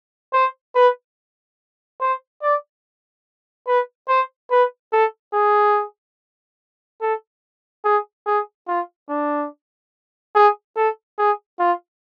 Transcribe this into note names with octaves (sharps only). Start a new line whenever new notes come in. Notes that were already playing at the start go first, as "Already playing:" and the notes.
C5
B4
C5
D5
B4
C5
B4
A4
G#4
A4
G#4
G#4
F4
D4
G#4
A4
G#4
F4